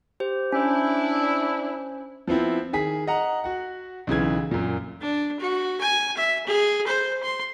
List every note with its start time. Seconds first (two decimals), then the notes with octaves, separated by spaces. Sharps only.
0.20 G4 C5
0.52 C#4 D4 E4 C5
2.27 F3 B3 C4 E4
2.73 D#3 G#4 G#5 B6
3.07 D#5 F#5 A#5
3.44 F#4 F#5
4.07 B1 C#3 E3 G#6
4.51 F#2 A#2
5.00 D4
5.40 F#4
5.80 G#5
6.17 E5
6.46 G#4
6.87 C5
7.23 C6